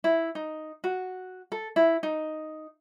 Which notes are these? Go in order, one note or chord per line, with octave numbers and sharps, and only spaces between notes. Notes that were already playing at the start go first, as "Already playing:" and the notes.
E4
D#4
F#4
A4
E4
D#4